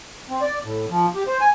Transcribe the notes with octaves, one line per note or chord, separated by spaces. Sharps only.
C4
D5
A2
F3
G4
C5
G#5